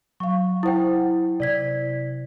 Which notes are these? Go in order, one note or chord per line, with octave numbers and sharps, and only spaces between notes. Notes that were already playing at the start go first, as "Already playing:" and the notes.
F#3 F5 C#6
E4 C5 F#5 G5 D#6
C3 E4 D5 G#6 B6